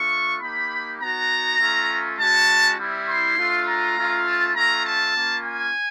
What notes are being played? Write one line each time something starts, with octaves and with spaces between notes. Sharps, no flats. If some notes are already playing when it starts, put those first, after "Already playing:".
Already playing: A3 D4 F4 C#6
A#3 D#4 G4 B5
B3 D#4 F#4 A#5
A3 C#4 F4
G#3 C#4 F#4 A5
G3 C4 E4
C6
A3 D4 F4
A#5
A3 C#4 F4
A5
A3 C#4 F4 A#5
A5
A#3 C#4 F4
G#5